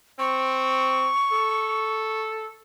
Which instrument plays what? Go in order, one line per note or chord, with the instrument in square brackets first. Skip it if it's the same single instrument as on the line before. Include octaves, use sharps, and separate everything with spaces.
[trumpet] C4 [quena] C#6
[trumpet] A4